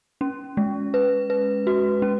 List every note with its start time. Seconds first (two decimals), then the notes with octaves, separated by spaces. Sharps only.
0.21 C#4
0.57 G#3
0.94 B4
1.30 B4
1.67 F#4
2.02 C#4